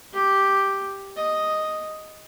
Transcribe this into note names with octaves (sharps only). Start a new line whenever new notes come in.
G4
D#5